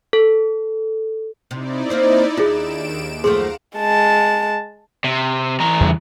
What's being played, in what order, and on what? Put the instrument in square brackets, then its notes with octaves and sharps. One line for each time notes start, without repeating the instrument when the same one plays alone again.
[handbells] A4
[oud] C3 [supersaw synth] D#4 E4 D5
[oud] A#3 C4 C5
[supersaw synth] D#2 D7 E7 [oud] D4 [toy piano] F4 G#4
[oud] F#2 F3 A3 [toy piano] G#4 C6 [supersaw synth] F5 F#5 A#5
[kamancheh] G#3 A5
[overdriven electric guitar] C3
E3 A#5
[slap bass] E2 C#3 G3